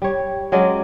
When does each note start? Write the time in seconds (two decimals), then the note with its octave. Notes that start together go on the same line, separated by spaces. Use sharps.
0.02 G3 C#5
0.52 F#3 G#3 C#4 D5